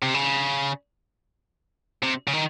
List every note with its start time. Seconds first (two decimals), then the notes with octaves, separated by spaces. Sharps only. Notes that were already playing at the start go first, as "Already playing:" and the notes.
0.02 C3
0.14 C#3
2.03 C3
2.28 C#3
2.33 D#3